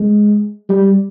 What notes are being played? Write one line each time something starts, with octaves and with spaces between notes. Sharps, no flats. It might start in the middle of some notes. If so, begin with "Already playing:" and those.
Already playing: G#3
G3